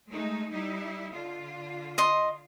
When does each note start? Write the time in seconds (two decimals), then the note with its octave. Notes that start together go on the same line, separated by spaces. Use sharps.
0.11 G#3 A3 D#4
0.51 G3 D#4 E4
1.13 D3 F4
1.98 D#5 C6